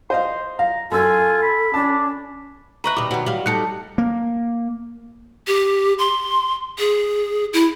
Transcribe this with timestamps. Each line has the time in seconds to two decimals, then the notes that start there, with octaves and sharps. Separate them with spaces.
0.10 C5 D#5 F5 C6
0.59 F5 A#5
0.92 F#2 F4 A4 G#5 E6
1.43 B5
1.74 C#4 D4 A5
2.84 B4 D#5 E5 A#5 C#6 F#6
2.97 D#2 B2 G3 D6
3.11 B2 D#3 F#3
3.26 F#3 G3 F5
3.46 G3 D#4 A4 F#6 C#7
3.98 A#3
5.47 G4
5.98 C6
6.79 G#4
7.53 E4